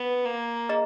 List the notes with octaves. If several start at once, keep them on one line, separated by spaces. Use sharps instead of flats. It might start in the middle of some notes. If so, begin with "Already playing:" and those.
Already playing: B3
A#3
G#4 D#5 A#5